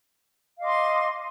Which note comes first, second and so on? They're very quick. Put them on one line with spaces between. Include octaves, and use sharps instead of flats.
F5 D#5 D6 C6